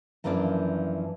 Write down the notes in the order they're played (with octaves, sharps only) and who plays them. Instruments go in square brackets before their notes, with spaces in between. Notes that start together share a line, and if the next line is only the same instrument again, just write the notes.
[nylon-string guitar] F#2 E3 F3 A#3 D4 D5